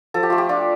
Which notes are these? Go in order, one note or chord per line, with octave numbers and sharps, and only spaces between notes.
F3 A4
G4
A3 F4
G4
D4 F4